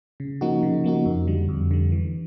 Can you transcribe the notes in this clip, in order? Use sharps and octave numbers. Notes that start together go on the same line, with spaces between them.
C#3
F3 A#3 D#4 F#4
C#3
F3 A#3 D#4 F#4
F2
D3 G3
F2
D3 G3
E3